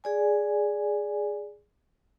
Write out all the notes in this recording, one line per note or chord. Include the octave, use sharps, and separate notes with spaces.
G#4 D5 G#5